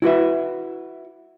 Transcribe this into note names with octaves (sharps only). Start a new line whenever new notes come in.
E4 F#4 B4 E5